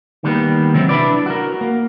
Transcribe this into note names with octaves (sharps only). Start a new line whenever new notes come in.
D#3 G3 A#3 B3
C3 E3 F#3 G#3 C4
D4 E4 B4 D5
F#4 A#4
A#3